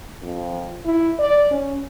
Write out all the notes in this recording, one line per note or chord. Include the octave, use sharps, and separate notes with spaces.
F2
E4
D5
C#4